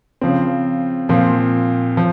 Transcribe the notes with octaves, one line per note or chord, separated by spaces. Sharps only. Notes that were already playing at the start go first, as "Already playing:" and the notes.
C#3 F3 C4
A#2 F3 C4
F3